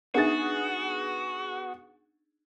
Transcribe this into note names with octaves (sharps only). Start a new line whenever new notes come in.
B3 D4 D#4 F#4 G#4 E5 A6